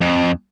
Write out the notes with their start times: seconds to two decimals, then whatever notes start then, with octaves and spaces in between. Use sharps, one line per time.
0.01 F2